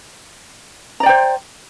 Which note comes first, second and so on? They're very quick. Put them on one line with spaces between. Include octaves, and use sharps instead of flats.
A#5 D5 G5 C5